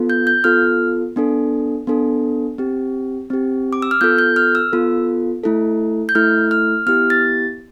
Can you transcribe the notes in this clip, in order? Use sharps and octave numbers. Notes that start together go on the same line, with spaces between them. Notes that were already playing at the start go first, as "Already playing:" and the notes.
Already playing: B3 F4 A4
G6
G6
B3 F4 A4 F6
B3 D4 A4
B3 D4 A4
C4 G4
C4 G4
D6
E6
F6
B3 F4 A4 G6
G6
F6
E6
B3 F4 A4
A3 E4 A4
G6
A3 E4 A4 F6
F6
B3 E4 G4 F6
A6